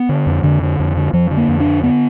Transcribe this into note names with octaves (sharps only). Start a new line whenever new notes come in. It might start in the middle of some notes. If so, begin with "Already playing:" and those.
Already playing: B3
D3
F2
F2 D3
D3
F2
D3
F2 F3
D3
A#3
F2
D4
D3
D3 B3